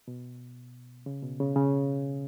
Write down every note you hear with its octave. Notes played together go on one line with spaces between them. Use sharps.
B2
C#3
B2
C#3
C#3